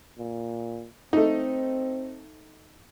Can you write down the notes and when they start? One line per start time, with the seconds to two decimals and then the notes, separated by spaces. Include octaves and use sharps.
0.18 A#2
1.13 A3 C4 D#4